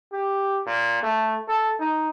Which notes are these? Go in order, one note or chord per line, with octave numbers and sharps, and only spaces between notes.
G4
A#2
A3
A4
D#4